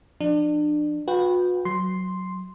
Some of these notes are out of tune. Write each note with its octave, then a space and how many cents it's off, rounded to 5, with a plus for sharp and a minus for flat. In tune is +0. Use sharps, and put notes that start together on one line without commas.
F3 +0 D4 +30
F#4 -45 B4 +0 G5 +0
F#3 +0 C6 +0